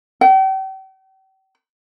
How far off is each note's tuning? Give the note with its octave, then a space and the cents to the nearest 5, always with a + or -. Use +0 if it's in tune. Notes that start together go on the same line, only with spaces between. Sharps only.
G5 -40